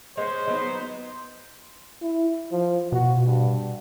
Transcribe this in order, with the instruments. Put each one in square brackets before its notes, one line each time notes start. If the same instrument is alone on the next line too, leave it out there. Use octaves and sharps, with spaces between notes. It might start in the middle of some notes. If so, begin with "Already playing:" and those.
[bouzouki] G#3 B3 C#4 [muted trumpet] C5
[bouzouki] F#3 B3 D#4
[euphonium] E4
F3
[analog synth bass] B2 [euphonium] F#4
[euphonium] G2